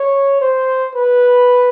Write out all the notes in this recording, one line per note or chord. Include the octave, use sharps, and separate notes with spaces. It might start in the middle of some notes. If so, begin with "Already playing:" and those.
Already playing: C#5
C5
B4